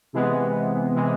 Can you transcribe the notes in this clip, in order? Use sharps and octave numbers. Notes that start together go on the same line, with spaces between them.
C3 E3 G#3 B3
C3 E3 G#3